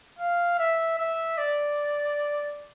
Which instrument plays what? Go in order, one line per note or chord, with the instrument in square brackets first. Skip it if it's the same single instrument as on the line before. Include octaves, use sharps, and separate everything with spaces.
[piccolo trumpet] F5
E5
E5
D5